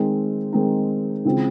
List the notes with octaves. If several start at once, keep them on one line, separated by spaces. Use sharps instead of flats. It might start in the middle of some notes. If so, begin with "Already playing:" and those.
Already playing: D#3 G#3 C4 D#4
D#3 G#3 C4 D#4
C#3 E3 G#3 C4 F4